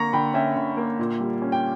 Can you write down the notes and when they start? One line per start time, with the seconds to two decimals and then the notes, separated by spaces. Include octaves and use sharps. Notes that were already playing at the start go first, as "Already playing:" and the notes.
Already playing: D3 A#3 A#5 C#6
0.13 D3 G5 B5
0.34 C#4 E5 G5
0.56 D3
0.77 A#3
0.99 A#2
1.20 G3
1.42 C#4
1.52 G5